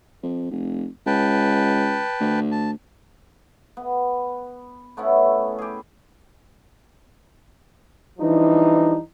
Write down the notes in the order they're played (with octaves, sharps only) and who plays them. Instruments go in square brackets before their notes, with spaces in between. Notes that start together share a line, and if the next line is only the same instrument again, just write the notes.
[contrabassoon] F2
F1
[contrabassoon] C#2 [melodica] B4 G5 A5
[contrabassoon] D2
[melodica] A5
[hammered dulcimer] B3
A3 B3 C#4 E4
G4 G#4
[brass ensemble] E3 F3 G3 D4 D#4